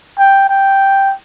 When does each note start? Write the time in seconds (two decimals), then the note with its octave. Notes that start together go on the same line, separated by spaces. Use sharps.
0.18 G5
0.49 G5